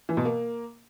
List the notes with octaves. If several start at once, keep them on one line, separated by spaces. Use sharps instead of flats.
E3
B2
A#3